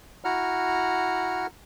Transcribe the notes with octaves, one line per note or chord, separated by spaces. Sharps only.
E4 F#4 F#5 A#5 F6